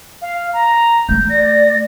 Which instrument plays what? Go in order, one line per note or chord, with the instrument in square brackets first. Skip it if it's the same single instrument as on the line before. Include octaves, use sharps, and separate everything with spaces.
[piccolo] F5
A#5
[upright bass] A3 [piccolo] G6
[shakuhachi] D5 [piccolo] A#6